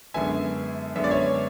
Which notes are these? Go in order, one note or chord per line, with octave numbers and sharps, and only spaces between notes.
F#2 D3 G#3 B3 E5 G#5
F#2 D3 G#3 B3 E5
D5
C#5 E5